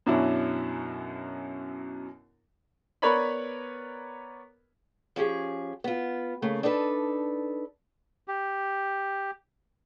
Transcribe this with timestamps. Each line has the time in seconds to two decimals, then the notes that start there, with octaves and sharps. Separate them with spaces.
0.06 F#2 B2 F#3 C#4 D4 E4
3.02 B3 A#4 B4 C#5 D5 B5
5.16 F3 C#4 G4 G#4
5.84 B3 F4
6.42 C#3 A3 A#3
6.63 D4 D#4 A4 B4
8.27 G4